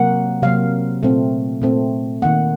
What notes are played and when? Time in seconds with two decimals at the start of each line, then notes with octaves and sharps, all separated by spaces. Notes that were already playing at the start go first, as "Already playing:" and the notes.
Already playing: C3 F#3 A#3 F#5
0.43 C3 F#3 A#3 F5
1.03 A#2 A3 C4
1.62 A#2 A3 C4
2.22 D#3 A#3 F#5